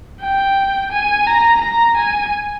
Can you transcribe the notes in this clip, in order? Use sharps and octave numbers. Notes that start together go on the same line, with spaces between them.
G5
G#5
A#5
A#5
G#5